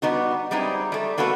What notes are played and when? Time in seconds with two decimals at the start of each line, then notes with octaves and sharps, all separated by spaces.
0.02 G3 B3 D#4 F#4
0.51 G3 G#3 C4 D#4 E4
0.92 G3 A3
1.18 A#3 B3 F#4 A4 B4